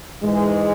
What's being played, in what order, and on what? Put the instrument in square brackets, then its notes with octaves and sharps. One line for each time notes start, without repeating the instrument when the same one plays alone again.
[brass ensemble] G#2 E3 G#3